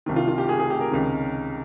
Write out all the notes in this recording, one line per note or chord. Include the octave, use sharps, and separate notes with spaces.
C2 C3 D#3
F4
F4
G4
G#4
G#4
G4
A#4
C#2 C3 D#3